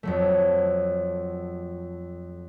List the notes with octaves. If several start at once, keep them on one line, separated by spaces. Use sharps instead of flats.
F2 F#3 A3